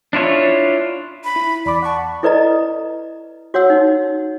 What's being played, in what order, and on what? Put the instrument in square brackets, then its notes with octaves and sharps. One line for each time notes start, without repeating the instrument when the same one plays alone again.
[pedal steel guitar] D4 E4 F4 C#5
[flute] B5
[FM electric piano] E4 B6
[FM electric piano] E2 B5 D6 [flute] D5
[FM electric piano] F#5 A5 [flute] C#6
[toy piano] E4 A4 B4 D5 D#5 A#5
F#4 C#5 F#5 E6
D#4